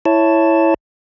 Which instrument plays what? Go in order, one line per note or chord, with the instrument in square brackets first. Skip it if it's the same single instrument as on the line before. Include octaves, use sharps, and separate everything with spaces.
[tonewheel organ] E4 C#5 A5